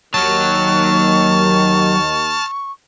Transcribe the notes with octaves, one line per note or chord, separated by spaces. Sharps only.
D#2 D#3 F#3 A5 C#6 F6